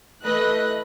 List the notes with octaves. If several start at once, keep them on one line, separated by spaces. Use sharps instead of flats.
E3 A3 B4 D#5 F#6